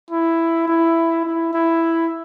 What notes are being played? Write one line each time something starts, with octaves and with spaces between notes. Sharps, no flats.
E4
E4
E4
E4